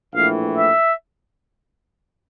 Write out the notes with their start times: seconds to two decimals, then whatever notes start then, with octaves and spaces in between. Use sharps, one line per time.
0.13 A#1 A2 E3 F5
0.54 E5